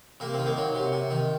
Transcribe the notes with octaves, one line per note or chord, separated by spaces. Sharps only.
C3 A#3
D#3 C4
A#3
F#3
C3
C3
D#3